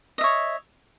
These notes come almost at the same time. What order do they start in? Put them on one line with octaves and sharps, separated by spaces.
D#5 E5 C#5